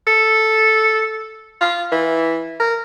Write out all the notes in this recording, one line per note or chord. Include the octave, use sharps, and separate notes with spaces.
A4
F4
E3
A#4